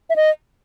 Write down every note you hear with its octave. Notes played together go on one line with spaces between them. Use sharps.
E5
D#5